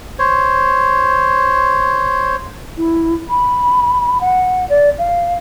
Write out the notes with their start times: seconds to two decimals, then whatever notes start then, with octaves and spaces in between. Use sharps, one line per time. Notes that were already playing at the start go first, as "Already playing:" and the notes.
0.19 C5 C#5
2.77 E4
3.30 B5
4.21 F#5
4.70 D5
4.98 F5